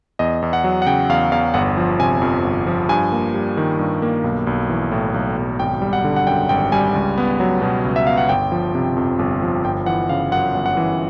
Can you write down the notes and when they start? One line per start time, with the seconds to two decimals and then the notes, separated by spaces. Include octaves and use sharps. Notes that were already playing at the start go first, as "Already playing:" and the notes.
0.19 E2 D#5
0.42 E2
0.53 F#5
0.64 F#3
0.82 F#5
0.86 C#3 G5
1.09 E2 F5
1.32 E2 F5
1.54 G1 F#5
1.77 F3
1.99 C3 G#5
2.22 F2
2.45 G1
2.66 F3
2.89 G2 G#5
3.12 A#3
3.34 G3
3.57 D#3
3.79 G2
4.02 A#3
4.24 B1
4.47 B1
4.70 E3
4.91 A2
5.14 B1
5.37 B1
5.59 G#1 G5
5.82 G3
5.93 F#5
6.04 D3
6.16 F#5
6.27 F#2 G5
6.49 G#1 G5
6.72 G3 G#5
6.95 C#2
7.18 B3
7.40 F#3
7.62 B2
7.85 C#2
7.96 E5
8.07 B3 F5
8.18 F#5
8.29 G1 G5
8.52 F3
8.75 C3
8.97 F2
9.19 G1
9.43 F3
9.64 G1 G5
9.86 E3 F#5
10.09 C#3 F5
10.31 F#2 F#5
10.54 G1
10.66 F#5
10.77 E3